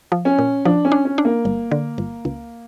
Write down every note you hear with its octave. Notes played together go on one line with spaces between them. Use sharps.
F3
C#4
A#2
F3 D4
C#4
D4
C#4
D4
A#3
G1
D3
G1
C#2